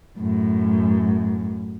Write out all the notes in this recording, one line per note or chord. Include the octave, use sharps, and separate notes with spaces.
F#2 A2